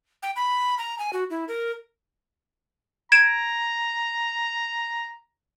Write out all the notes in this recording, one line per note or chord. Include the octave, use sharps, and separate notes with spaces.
G5
B5
A#5
G#5
F#4
E4
A#4
A#5 G#6 D7 E7